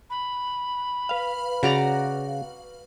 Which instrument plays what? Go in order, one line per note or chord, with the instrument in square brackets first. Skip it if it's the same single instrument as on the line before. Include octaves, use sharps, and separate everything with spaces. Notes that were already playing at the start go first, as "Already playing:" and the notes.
[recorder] B5
[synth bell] B4 F5
[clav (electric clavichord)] C#3 [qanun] F#4 D5 A#5